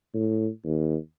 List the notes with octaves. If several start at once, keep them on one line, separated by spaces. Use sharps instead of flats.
A2
D#2